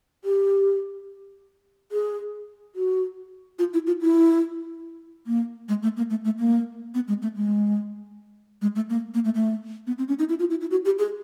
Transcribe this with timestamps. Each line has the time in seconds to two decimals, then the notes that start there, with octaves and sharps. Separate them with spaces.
0.24 G4
1.92 G#4
2.75 F#4
3.59 F4
3.73 E4
3.87 F4
4.01 E4
5.27 A#3
5.69 G#3
5.83 A3
5.97 A#3
6.10 A3
6.25 A3
6.39 A#3
6.95 B3
7.08 G#3
7.22 A3
7.36 G#3
8.62 G#3
8.75 A3
8.90 A#3
9.14 A#3
9.25 A3
9.35 A3
9.87 B3
9.98 C4
10.08 C#4
10.19 D#4
10.29 E4
10.39 F4
10.50 E4
10.61 E4
10.71 F#4
10.85 G4
10.99 G#4